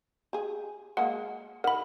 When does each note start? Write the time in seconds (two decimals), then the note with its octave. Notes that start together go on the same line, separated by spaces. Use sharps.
0.33 G4 G#4
0.97 G#3 A#3 F#5
1.64 D#3 A#4 F#5 B5